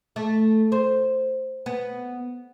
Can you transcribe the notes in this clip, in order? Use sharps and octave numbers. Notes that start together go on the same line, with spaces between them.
A3
C5
B3